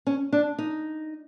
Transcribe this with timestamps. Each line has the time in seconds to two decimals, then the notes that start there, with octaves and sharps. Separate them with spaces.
0.07 C#4
0.32 D4
0.58 D#4